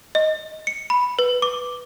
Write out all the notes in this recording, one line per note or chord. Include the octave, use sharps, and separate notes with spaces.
D#5
C#7
B5
B4
D6